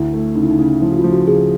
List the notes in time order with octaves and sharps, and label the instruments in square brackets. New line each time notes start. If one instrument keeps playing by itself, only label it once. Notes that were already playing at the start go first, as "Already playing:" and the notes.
Already playing: [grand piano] D2 [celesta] E4
[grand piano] A3
[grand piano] C#3 [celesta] D#4
[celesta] E4
D#4
[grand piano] C#3 [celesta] E4
[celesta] D#4
[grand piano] F3 [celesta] E4
[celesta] F#4
F4
[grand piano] F3
[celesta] F#4
[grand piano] C#3 [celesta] G#4